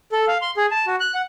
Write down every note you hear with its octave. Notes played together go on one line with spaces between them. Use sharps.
A4
F5
C6
G#4
A5
F#4
F#6
F#5